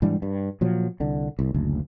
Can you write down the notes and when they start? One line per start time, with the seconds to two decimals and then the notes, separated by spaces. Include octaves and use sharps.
0.02 G#2 E3 G3 D4
0.22 G2
0.61 A#2 F3 F#3
1.00 C2 D3
1.39 C2
1.54 F#1 D2